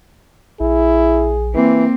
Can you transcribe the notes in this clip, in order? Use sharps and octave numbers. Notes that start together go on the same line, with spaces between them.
A#1 E4 G#4
E3 A#3 C4